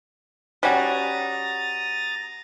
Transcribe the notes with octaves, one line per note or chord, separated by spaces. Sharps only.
G3 C#4 F#4 A#5 D#6 A6